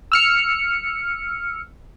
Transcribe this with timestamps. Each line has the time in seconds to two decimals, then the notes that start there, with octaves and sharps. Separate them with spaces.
0.12 E6 F6 C#7